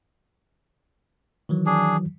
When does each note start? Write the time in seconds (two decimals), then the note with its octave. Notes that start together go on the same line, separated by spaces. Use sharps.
1.49 D#3 E3 F#3
1.66 D4 G#4